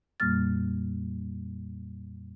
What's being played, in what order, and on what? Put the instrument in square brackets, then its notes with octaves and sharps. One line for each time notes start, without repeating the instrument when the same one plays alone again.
[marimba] F2 A#2 G3 A#3 F6 A6